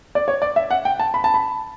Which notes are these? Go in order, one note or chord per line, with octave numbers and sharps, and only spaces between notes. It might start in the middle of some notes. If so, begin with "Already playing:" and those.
D5
C#5
D5
E5
F#5
G5
A5
B5
A5
B5